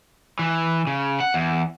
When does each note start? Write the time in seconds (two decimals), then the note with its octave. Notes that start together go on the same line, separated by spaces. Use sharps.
0.39 E3
0.87 C#3
1.20 F#5
1.34 E2